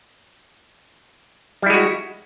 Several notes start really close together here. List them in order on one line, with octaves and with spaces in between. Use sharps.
G3 E4 G#3 F#4